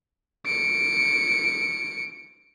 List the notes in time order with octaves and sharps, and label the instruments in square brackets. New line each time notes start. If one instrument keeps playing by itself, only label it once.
[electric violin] C#7 D7